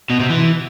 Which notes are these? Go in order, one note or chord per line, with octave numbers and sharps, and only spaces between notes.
B2
C3
E3